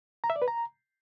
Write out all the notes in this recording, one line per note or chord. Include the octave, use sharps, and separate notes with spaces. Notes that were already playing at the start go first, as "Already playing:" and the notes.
A#5
E5
D5
B4
A#5